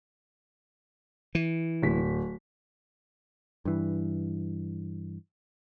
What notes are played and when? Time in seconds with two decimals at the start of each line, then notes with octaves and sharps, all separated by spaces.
1.35 E3
1.82 D1 B6
3.65 G2 E3